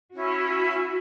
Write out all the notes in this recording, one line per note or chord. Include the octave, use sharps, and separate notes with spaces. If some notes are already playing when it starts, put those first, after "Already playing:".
C#4 E4 F#4